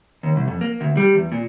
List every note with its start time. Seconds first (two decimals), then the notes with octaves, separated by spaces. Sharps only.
0.23 D#2
0.36 C2
0.48 F2
0.61 A#3
0.81 D2
0.97 G3
1.15 E2
1.32 A#2